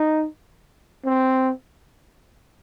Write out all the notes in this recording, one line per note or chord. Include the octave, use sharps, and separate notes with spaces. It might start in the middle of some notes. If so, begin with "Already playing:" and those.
Already playing: D#4
C4